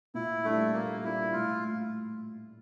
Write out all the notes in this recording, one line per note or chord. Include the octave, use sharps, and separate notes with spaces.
A#2 E4
G3 A3 D4 F4
A#2 A#3
G3 D4 E4 F4
A2 F4